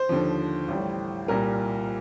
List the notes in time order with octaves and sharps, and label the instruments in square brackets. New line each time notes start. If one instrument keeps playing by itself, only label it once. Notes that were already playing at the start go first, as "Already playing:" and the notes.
Already playing: [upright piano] C5
D#2 D3 F3
A1 A2 G3
C2 A#2 G3 A#4